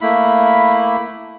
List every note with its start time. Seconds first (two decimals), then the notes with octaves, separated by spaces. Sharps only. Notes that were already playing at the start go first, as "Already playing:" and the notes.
0.01 A3 A#3 E4 B5